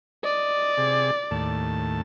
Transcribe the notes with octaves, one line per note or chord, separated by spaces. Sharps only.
D5 D#5
C3 G#4
D#2 A2 A5